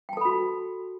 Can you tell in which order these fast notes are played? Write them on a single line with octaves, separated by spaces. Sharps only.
G5 A5 A4 B5 F#4